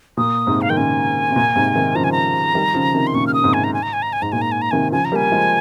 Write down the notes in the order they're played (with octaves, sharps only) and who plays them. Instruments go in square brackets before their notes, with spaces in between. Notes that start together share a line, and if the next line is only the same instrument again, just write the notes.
[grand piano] A#2 [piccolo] D#6
[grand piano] G#2 C3
[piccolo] F5
[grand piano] D#3 [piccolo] G5
[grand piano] A#2 C#3 [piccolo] G#5
[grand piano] C3
A#2
G#2 C3
C3 D#3
[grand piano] C#3 F3 [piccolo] A#5
[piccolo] G#5
A#5
[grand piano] D#3 G3
C#3 F3
C3 D#3
[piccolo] C6
[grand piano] A#2 C#3 [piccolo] C#6
[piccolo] F6
[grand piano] C#3 [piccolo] D#6
[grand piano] G#2 C3
[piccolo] G#5
A#5
G#5
A#5
G#5
A#5
G#5
[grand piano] G#2 [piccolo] A#5
[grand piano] A#2 [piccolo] G#5
[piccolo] A#5
G#5
A#5
[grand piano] C3 D#3 [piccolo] G#5
[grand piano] C#3 F3 [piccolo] G#5
[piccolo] A#5
[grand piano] G3 A#3
[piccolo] G#5
[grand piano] F3 G#3